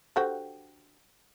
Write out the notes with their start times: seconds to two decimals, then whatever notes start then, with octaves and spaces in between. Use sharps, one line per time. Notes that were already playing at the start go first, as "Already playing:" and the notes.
0.16 D3 F#4 G4 A4 C5 G5